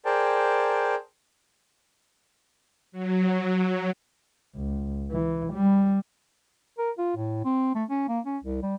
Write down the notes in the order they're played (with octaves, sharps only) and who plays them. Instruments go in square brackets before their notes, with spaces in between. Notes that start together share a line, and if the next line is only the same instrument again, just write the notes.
[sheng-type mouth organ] G#4 A#4 C5 D5 G5 A5
[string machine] F#3
[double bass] C#2
E3
G3
[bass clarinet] A#4
F4
A2
C4
A3
C#4
A#3
C#4
C2
G3